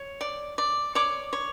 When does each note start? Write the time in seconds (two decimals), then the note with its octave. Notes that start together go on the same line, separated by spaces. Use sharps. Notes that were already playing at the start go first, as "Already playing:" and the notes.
Already playing: C#5
0.21 D5
0.58 D5
0.95 C#5 D5 D6
1.33 C#5